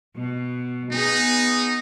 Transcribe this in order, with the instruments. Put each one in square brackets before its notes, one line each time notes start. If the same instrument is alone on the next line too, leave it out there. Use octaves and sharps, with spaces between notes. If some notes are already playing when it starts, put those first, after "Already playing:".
[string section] B2
[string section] B3 G#4 [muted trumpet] D#4